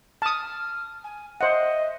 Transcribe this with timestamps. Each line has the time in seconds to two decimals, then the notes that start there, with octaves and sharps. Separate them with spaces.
0.22 A5 D#6 F6
1.04 G#5
1.41 C5 D#5 E5 F#5